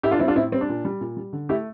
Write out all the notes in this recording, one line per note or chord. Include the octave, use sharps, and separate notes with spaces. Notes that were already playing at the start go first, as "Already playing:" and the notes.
A2 E4 G4
D4 F4
G3 C4 E4
D4 F4
A2 C4 E4
G3 C4
D4
A#2
G3
A#2
G3
D3
A3 E4 G4